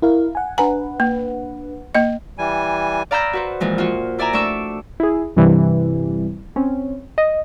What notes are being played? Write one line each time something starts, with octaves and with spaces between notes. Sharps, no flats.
E4 A#4 F5
F#5 G#5
D4 B4 F#5 G#5 A#5
A#3
A#3 D#5
E3 G3 G#5
D5 F5 A#5 B5 E6 G6
F#4 B4 C5
A#2 E3 F3 G#3
F4 F#4
E4 D5 E5 G#5 A#5
A3 D4 C#6 D6 E6
E4 G#4
G2 C3 E3 G3
C4 C#4
D#5